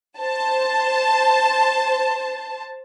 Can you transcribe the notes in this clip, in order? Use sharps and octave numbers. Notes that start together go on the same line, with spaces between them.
C5 A5